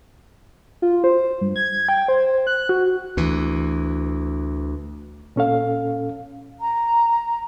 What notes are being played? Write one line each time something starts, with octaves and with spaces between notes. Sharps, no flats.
F4
C5
G2
G#6
G5
C5
F#6
F#4
D2 E3
A#2 C#4 A4 F5
A#5